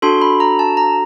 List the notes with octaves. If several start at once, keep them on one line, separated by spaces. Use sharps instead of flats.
D4 F#4 A4 C6
B5
A#5
A5
A#5